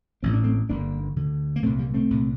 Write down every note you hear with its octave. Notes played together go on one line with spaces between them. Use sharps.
A1 A2 C4
D4
A3 C4
G1 G2 D3 A#3 D4
D2 D3
A#3
C2 A#2 A3 C4
G3 A#3
A3 C4
C2 A#2